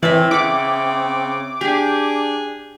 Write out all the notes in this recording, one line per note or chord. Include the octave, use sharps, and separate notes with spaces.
A2 E3 C4 D5 E5
C#3 E4 F#5 D6
D4 G4 G#4 G#5